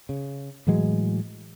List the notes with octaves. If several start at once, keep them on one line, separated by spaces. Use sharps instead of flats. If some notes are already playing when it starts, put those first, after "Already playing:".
C#3
A2 E3 F#3 G#3